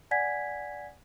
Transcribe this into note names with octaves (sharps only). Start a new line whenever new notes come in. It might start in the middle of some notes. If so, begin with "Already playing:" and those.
D5 F#5 G#5 G#6 B6